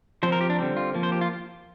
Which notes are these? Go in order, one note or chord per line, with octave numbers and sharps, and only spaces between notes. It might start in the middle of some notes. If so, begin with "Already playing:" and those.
F3 C4 C5
A#4
G4
D4
D3 G3 C4
F4
F3 A#3
C5
G4
F4